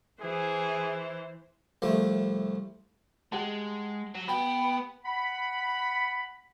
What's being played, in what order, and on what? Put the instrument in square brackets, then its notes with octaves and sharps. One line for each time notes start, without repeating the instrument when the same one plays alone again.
[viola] E3 C5 [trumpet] G#4
[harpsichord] C2 F3 A3
[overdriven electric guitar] G#3 [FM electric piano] G4 F#5 A5
[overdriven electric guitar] F#3
[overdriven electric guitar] B3 B4 [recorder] G5
[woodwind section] F#5 B5